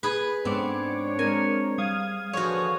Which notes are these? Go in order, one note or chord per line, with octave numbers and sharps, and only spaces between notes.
G#4 B4
G#2 B3 C4 D4 A4 C#5 F#5 D6
G#3 C4 A#4 G#5
G3 F5 D#6 G#6
D3 E3 F3 F#4 G#4 C5 C#5